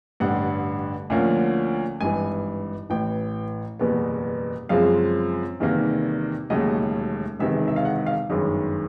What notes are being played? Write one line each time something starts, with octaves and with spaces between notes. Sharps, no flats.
A1 G2 D3 F#5
D2 D3 F3 A#3 C#4
G#1 G2 E3 G#5
A1 A2 E3 G5
F#1 E2 B2 G3 B3
F#2 C#3 F3 G#3 C4 F5
E2 C3 D#3 G3 A#3
E1 D#2 C#3 F#3 A3 D#5
E1 E2 C3 D#3 E5
E5
F5
F#5
F5
G1 F#2 D#3 G#3